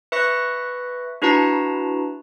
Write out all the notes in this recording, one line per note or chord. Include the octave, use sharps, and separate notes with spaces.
B4 E5 C#6 F#6 A#6
D4 E4 F#4 B4 A5 A#5